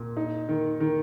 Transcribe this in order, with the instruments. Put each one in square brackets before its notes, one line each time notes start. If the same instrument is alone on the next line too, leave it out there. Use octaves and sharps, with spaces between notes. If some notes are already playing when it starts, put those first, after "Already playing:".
Already playing: [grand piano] A#2
D#4
D#3
D#3